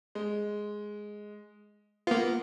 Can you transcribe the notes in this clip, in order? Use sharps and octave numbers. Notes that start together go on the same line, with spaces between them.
G#3
A#3 B3 F4